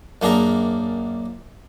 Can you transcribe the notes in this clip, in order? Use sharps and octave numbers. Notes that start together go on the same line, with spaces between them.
F#2 A#3 D4 G#4 A#5